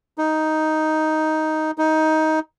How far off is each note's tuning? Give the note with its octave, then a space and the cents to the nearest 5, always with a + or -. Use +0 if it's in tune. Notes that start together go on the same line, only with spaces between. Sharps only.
D#4 +5
D#4 +15